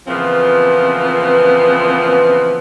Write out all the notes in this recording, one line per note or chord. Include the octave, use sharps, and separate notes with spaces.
A#2 C#3 E3 F3 B3 C4